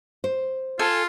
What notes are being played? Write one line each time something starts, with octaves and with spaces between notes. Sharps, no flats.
C5
F4 A4 G#5